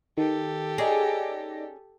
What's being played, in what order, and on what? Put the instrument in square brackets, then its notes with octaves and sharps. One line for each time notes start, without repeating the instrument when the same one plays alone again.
[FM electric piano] D#3 [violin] G4 A4
[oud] C#4 G#4 [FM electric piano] D#4 D5 A#6